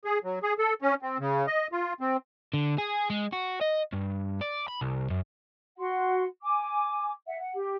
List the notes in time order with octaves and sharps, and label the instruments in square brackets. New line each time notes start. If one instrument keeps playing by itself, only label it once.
[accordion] G#4
F#3
G#4
A4
C#4
C4
C#3
D#5
F4
C4
[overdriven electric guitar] D3
G#4
G#3
F#4
D#5
G2
D5
B5
C2
F#2
[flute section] F#4 F#5 C6
G#5 D6
E5 F#5
F#5
G4